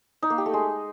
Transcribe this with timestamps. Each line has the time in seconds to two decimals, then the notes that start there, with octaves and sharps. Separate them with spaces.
0.22 D#4
0.30 A#3
0.38 G4
0.46 A3
0.53 G#3